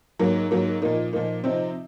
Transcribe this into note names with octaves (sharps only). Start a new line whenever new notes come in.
G#2 F#3 A#3
G#2 F#3 A#3
A#2 F3 A#3 D#4
A#2 F3 A#3 D#4
C3 F3 C4 D#4